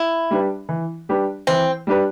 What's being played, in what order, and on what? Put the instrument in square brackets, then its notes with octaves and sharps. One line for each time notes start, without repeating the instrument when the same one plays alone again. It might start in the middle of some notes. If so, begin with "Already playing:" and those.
Already playing: [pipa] E4
[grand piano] G3 D4 G4 B4
E3
G3 D4 G4 B4
[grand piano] E3 [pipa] C4
[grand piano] G3 D4 G4 B4